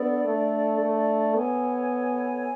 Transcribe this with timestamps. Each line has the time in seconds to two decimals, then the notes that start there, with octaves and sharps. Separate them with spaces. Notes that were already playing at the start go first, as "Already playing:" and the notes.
Already playing: B3 D4 A4 D5
0.24 A3
0.80 A3
1.35 B3 A4 C#5 G#5